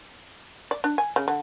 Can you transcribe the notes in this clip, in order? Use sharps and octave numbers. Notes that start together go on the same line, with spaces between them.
D5
D4
G#5
C#3
D3